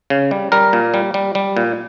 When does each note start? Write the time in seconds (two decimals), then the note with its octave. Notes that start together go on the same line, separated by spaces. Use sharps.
0.10 C#3
0.31 G3
0.52 G3 A#4
0.73 A#2
0.94 G3
1.14 G3
1.35 G3
1.57 A#2